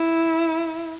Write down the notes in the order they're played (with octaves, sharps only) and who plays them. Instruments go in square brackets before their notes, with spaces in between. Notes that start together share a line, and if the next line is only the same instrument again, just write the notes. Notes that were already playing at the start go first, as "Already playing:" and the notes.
Already playing: [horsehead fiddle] E4